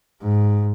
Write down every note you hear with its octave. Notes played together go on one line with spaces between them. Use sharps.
G#2